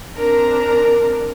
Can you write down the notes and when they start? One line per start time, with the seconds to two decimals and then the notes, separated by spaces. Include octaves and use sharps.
0.16 C4 D4 A#4 A#5